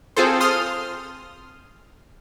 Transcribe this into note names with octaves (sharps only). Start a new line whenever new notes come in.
C4 F4 G#4 A4 C5
C6 D#6 F6